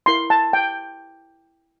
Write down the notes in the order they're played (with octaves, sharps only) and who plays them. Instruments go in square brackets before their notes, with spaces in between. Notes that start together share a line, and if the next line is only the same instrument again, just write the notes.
[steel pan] E4 A#4 C6
A5
G5